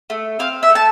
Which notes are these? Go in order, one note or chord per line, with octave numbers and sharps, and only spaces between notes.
A3
C4 F5
E5
A3
A5